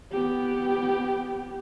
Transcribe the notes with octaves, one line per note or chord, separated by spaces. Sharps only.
B3 G4